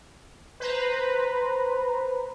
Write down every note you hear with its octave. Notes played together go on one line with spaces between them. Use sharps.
B4 C5 A#5